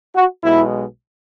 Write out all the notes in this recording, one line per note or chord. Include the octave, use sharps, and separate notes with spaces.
F#4
B1 B2 G#3 E4